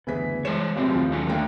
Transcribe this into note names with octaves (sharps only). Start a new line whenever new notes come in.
F#1 D2 E3 B3 G#4 B6
E3 G#3 C5 C#5 E7
F1 F#2 A#2 A3 C4
D#2 F3
B2 F#3 C#4
D3 A3 A#3 D4 G5